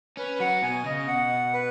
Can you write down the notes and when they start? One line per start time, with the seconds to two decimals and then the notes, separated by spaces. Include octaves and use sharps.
0.17 C#4 B4
0.40 F#3 F#5
0.62 B2 G#5
0.85 C#3 D#5
1.07 B2 F#5
1.53 B4